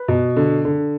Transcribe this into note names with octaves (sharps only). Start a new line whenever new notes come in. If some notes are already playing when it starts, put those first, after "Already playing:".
Already playing: B4
B2
D3
D3